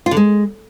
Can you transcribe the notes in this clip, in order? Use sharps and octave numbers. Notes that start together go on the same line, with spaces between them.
F4
D3
G#3